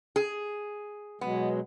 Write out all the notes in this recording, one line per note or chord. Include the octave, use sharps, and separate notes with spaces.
G#4
B2 F#3 G#3 B3